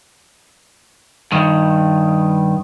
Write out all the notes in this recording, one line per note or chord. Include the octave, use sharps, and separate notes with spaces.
G2 D#3